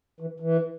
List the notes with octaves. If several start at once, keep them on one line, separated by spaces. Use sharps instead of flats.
E3
E3